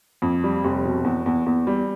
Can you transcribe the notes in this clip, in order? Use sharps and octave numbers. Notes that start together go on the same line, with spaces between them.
F2
G3
F1
B2
E2
E2
E2
G3